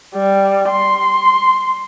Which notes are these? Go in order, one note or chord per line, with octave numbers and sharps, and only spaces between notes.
G3
C6